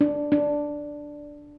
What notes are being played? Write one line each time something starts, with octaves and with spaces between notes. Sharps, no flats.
D4
D4